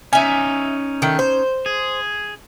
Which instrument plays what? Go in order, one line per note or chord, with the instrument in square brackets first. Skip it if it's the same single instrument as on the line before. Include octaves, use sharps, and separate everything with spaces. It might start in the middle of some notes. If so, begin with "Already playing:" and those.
[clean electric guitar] C#4 D#4 [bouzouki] E5 G#5
[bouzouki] D#3 A3
C5
[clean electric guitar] G#4